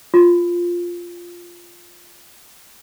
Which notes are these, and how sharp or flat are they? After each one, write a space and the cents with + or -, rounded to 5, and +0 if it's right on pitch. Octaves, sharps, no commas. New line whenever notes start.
F4 +0